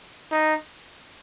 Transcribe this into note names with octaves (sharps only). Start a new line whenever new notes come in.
D#4